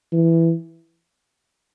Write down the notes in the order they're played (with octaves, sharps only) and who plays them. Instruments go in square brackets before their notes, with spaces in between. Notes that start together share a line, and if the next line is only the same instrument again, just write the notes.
[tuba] E3